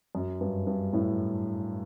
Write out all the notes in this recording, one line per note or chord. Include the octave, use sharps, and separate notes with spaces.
F#2
G2
G2
A2